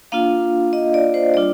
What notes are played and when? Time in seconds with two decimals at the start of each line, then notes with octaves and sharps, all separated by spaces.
0.12 A#3 D4 F4 F5
0.73 D#5
0.94 D5
1.14 C5
1.34 G3 D4 F4 D5